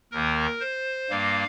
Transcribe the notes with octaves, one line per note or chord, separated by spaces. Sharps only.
D#2 D#3 A#3 A#4
C5
G2 G3 A#3 F5